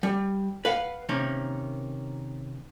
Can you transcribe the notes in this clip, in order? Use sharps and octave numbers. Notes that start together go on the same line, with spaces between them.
G3
B4 F5 F#5
C3 D#3 A#3 C#4